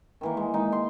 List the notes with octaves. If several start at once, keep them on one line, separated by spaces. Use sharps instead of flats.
D#3 E3 A#3
G#3
D#4 G5
C6